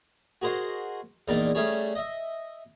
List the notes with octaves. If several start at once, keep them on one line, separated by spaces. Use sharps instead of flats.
F#4 G#4 A#4 C5 D#5 F#5
A#1 E2 A#2 D#4 A#4 D5
G3 A3 C#4 G#4 C#5
D#5 E5